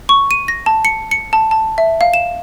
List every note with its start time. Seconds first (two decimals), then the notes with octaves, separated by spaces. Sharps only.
0.09 C#6
0.31 D#7
0.48 A#6
0.66 A5
0.85 C#7
1.11 C#7
1.33 A5
1.51 A5
1.78 E5
2.01 F5
2.14 E7